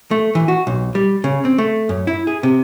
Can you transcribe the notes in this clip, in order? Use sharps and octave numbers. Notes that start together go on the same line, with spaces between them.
A3
E3
F#4
B1
G3
C#3
C4
A3
F#2
E4
G#4
C3